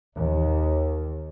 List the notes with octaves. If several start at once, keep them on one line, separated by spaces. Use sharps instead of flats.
D#2